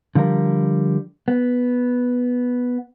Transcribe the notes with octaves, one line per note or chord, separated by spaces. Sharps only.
D3 F3 G3 A#4
B3